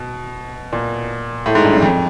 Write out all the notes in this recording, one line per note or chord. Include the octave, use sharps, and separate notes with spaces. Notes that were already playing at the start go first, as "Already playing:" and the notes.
Already playing: B2
A#2
A2
G#2
G2
F#2
F2